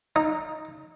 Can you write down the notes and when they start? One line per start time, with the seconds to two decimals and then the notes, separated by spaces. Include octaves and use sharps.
0.16 D#4